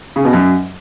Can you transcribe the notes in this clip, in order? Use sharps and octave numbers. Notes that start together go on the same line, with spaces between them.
C#3
B2
F#2